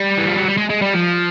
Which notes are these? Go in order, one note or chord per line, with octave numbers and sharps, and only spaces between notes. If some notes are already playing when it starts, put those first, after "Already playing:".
Already playing: G3
E3
F3
F#3
G3
G#3
G#3
G3
F3